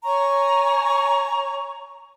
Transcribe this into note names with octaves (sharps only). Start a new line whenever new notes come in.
C#5 G#5 A#5 C#6